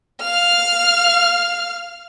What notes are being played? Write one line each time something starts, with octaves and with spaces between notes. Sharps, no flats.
F5 F6